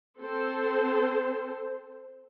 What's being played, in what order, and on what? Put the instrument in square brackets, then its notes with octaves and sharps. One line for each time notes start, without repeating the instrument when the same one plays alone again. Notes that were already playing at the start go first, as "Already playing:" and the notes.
[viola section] C4 A4 C5